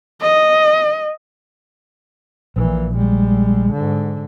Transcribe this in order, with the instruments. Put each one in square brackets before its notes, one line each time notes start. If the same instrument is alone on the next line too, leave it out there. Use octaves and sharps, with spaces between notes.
[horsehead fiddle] D#5
[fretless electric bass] A#1 [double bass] A#2 E3
[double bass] G3 G#3
G#2 D3